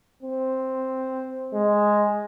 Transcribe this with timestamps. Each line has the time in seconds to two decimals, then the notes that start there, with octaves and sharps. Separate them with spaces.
0.23 C4
1.53 G#3